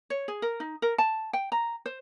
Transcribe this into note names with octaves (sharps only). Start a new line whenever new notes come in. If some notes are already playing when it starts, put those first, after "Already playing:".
C#5
G#4
A#4
D#4
A#4
A5
G5
A#5
C5